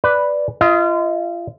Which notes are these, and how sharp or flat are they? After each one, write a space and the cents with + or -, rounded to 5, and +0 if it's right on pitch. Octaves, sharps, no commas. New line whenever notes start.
B4 +0 D5 +0
F4 -30 D#5 +25